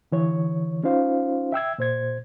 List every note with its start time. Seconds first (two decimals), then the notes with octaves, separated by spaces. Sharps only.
0.12 D3 E3 C#5
0.83 C#4 D#4 F4 C5 F5
1.52 E5 G5 E6 G#6
1.78 A#2 C5 G#6